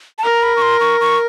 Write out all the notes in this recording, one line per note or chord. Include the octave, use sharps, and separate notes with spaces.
A5
A#4 A#5
B5
C#6
C6
C#6
C#6